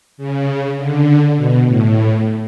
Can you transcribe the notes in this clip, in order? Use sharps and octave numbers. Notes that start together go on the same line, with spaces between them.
C#3
D3
B2
A2